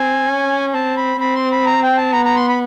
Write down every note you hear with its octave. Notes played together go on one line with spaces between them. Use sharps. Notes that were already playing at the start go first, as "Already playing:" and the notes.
Already playing: C4 G#5
C#4
C4 A5
B5
C4 B5
C6
B5
A#5
G5
A5
B3 A#5
A#5
C6
B5